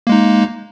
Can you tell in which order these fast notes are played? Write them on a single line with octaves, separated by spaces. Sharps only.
A#3 G#3 D#4